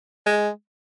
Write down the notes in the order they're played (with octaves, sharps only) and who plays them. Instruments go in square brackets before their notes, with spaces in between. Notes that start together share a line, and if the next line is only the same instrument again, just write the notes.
[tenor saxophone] G#3